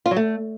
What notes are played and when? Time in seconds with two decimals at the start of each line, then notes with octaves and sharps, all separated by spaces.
0.06 F4
0.11 F#3
0.16 A3